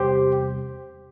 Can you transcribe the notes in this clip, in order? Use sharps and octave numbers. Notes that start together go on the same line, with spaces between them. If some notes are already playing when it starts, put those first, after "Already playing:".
Already playing: E2 C3 G3 G4 C5